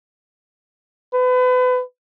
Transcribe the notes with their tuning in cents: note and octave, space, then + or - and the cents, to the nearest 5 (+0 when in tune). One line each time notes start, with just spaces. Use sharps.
B4 +35